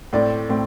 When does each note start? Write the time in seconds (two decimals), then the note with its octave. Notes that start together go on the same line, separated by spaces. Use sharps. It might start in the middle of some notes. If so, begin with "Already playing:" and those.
0.13 A2 A3 C4 D5
0.49 A2 A3 C4